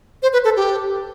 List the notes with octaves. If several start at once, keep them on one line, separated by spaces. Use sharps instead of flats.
C5
B4
A4
G4